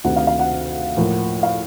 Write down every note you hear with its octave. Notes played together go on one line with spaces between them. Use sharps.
D2 C3 D#3 F#5
F5
F5
F#5
A2 F3 A#3
F5